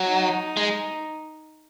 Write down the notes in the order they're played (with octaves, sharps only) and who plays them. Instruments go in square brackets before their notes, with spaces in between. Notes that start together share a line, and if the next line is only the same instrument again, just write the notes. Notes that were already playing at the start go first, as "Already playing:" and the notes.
Already playing: [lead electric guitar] F#3
[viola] D#4
[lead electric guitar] G#3